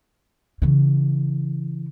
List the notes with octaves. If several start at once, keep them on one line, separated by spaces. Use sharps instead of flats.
C#3 E3